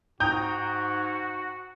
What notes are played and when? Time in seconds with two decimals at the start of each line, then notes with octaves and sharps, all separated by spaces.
0.20 G#2 F#4 G5 A#5 D#6 G6